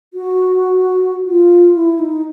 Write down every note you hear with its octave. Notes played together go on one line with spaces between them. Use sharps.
F#4
F4
E4
D#4